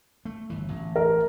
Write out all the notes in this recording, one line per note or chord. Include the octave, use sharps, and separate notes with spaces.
A3
G1 E3
A1 A2
A#4